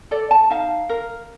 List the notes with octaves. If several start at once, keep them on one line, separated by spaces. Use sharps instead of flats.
A4 D5
A5
D#4 F5
A#4